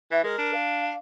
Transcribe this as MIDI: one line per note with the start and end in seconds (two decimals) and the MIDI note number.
0.11 0.21 52
0.11 0.23 76
0.23 0.34 56
0.23 0.51 70
0.38 0.93 62
0.53 0.93 77